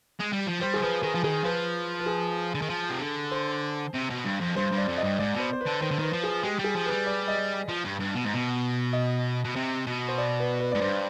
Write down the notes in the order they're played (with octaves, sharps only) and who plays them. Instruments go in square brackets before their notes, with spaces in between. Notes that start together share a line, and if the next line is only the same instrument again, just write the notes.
[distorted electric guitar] G#3
G3
F3
[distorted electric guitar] G3 [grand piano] C5
[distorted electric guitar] D#3 [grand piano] G#4
[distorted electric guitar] F3 [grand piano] B4
[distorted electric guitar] D#3 [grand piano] G#4
[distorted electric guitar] F3
[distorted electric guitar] D#3 [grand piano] G#4
[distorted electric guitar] F3 [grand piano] B4
[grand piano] B4
G#4
[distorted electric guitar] D3
D#3
F3
C3
D3
[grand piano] C5
[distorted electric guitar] C3
B2
G2
F2
[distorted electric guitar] G2 [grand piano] C5
[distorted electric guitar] G2
[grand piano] D5
[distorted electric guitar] F2
[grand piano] D#5
[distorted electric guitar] G2
[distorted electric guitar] G#2 [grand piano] D5
[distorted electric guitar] B2 [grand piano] C5
[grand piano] C5
B4
[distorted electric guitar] D3
[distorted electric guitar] D#3 [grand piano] C5
[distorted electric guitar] D3
[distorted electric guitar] D#3 [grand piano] B4
[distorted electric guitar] F3
[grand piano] G#4
[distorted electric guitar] G#3 [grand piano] G4
[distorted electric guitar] G3 [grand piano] G#4
[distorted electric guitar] F3
[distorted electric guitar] G3 [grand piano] B4
[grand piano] D5
D#5
[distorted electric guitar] F3
G2
G2
B2
G#2
B2
[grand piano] D#5
[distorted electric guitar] B2
C3
B2
[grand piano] C5
D5
B4
B4
[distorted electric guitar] G#2 [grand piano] D5
[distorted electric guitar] G2 [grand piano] C5